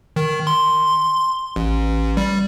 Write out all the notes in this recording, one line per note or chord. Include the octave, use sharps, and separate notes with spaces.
D#3
C6
A1
G3